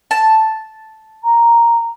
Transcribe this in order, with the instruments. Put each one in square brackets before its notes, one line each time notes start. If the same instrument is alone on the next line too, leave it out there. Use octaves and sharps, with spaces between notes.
[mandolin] A5
[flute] A#5